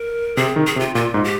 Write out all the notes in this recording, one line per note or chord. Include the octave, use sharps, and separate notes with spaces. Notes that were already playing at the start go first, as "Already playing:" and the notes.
Already playing: A#4
C3 G#4
D#3
G#4
C3
F4
A#2 F4
G#2
G4